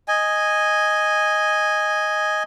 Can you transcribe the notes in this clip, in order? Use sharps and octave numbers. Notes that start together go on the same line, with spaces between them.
D#5 G#5